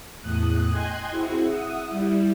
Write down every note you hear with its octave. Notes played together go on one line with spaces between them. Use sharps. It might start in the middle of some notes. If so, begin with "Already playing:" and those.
E2 A2 D#6 F#6
D#5 G5 G#5 C6 F#6 G#6
C4 E4 F#4 G#4
E5 F#5 D#6
G3 E4